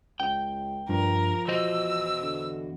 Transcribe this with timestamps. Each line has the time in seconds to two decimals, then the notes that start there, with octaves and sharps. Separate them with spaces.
0.20 C#2 G5
0.89 G2 F3 A#4
1.48 E2 F#4 C5 D#5 E6
2.22 D3